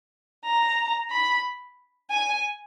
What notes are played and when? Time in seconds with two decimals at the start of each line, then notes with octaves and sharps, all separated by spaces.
0.45 A#5
1.11 B5
2.10 G#5